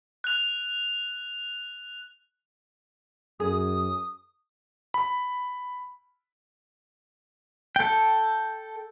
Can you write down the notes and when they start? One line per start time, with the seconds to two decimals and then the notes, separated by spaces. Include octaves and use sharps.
0.24 F#6 F7
3.40 F#2 G#4 D#6
4.94 B5
7.76 A4 G5